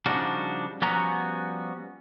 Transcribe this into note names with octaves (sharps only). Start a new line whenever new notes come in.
C#3 F3 G3 D4 D#4 F#4
F3 G3 B3 C#4 F#4 A#5